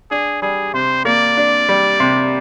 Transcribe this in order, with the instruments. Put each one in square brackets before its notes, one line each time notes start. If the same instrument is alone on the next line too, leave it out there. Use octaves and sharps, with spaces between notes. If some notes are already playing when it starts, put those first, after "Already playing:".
[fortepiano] D4 [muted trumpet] G#4
[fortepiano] G3 [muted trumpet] G#4
[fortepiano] C3 [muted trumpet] C5
[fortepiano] A#3 [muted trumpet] D5
[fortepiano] D4
G3
C3